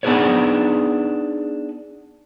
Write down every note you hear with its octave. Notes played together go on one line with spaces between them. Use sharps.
B3 D4 D#4 G#4 B4 C#5